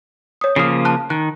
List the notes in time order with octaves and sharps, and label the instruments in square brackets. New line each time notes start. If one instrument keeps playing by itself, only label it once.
[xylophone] C#5 D#6
[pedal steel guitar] C#3 F3 A#3 [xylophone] D#6 C7
[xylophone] A5 F#6
[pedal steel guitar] D#3 [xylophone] F#6